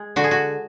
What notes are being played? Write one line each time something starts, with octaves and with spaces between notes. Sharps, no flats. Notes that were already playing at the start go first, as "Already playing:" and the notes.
Already playing: G#3
D3 F#4
G#4
F#4